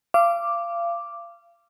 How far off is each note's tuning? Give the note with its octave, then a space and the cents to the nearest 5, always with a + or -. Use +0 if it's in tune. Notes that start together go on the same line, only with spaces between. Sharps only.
F5 -30 D6 +0